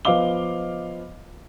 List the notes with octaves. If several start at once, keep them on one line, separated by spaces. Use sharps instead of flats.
F3 B3 D#5 F5 D6 G7